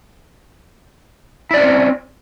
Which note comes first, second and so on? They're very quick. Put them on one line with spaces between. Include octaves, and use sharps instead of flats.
E4 D5 C#4 C5 C4